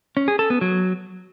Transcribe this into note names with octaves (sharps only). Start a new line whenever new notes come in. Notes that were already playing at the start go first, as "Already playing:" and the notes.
C#4
G#4
A4
B3
F#3